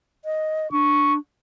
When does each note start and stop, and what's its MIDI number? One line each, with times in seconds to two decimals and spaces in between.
0.25 0.70 75
0.72 1.19 62
0.72 1.13 85